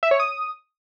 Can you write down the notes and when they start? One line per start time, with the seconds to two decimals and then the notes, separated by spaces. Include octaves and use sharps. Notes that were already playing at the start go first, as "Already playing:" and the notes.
0.03 E5
0.11 C#5
0.20 D#6